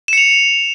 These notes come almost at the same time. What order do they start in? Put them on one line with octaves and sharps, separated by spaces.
E7 C#7 F7